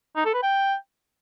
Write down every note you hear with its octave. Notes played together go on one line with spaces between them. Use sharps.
D#4
A4
B4
G5